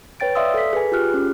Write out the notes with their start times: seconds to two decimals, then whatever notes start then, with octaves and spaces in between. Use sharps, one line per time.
0.20 B4 C#5 G5 A6 D7
0.35 D5 E5 F5 C6 D#6 E6
0.54 A4 B6
0.73 G#4 B4 G#5
0.92 F4 G4 G#4 F6 F#6
1.14 C#4